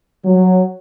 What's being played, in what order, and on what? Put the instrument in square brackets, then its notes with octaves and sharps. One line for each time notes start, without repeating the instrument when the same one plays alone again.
[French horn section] F#3